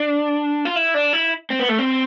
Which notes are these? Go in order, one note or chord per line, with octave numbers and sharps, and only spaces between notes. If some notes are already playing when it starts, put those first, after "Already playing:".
Already playing: D4
F4
E4
D4
E4
C4
B3
A3
C4